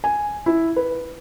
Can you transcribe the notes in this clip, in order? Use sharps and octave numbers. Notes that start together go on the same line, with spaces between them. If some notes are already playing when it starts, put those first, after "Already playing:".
G#5
E4
B4